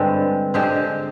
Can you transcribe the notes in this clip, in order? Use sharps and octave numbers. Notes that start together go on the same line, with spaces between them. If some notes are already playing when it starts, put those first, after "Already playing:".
Already playing: G2 D3 G#3 C4
D3 G#3 C4 G4